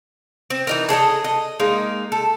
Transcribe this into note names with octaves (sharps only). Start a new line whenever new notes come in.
C4
E3 D#4 A#4
G#4 A4 D5 D#5
D#5
G#3 A#3 D#4
A4